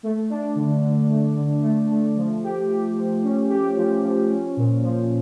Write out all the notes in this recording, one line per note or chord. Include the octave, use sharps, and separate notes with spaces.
A3
D4
D3
D3
A3
D3
A3
A3
F3
G4
G4
F3
C#4
G4
F3
F3
C#4
A#2
F3